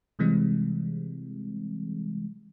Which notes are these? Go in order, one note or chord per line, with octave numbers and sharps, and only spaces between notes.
C3 E3 G3 G#3 C4